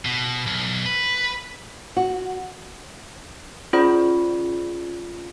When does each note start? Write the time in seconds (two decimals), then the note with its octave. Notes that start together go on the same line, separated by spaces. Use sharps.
0.05 B2
0.47 B1
0.86 B4
1.97 F#4
3.73 C#4 F4 G#4 C5 D5 B5